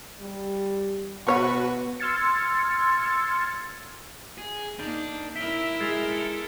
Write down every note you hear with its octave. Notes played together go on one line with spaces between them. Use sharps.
G3
B2 F#3 B3 F#4 B4 C#5 F#5 C#6
C6 E6 F6 G#6 A6 C#7
G#4
A#3 D4 D#4 G6
E4 A#4 E5 B6 D7 G7
G#3 G#6 A6 C7
A4 C#7